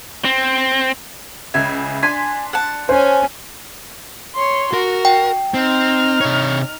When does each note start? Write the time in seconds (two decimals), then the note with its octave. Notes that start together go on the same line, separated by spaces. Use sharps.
0.25 C4
1.54 C#2 C#3 E5 G#5
2.03 D4 G#5 C6 B6
2.53 F#5 A5
2.89 C#4 C5 G#5
4.35 C#5 C6
4.73 F#4 A#4
5.05 G5
5.54 C4 D#4 F6
6.21 C3 C#5